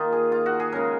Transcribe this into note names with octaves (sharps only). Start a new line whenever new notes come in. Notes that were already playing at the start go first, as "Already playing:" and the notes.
Already playing: D#3 A#3 D#4 F4
G#4
F4
F#4
G#4
C#3 G#3 C#4 A#4